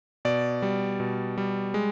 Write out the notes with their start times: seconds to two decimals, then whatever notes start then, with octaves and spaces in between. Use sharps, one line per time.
0.25 B2 D5
0.62 G3
1.00 B2
1.38 G3
1.74 G#3